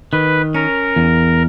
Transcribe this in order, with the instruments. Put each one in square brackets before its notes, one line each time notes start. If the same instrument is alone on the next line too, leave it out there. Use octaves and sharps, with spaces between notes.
[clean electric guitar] D#3 [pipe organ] B4
[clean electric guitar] C#4 [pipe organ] A#4
[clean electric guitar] E2